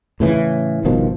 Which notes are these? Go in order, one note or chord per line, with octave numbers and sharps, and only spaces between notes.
A2 C#3 E3
G1 B2 D#3 F3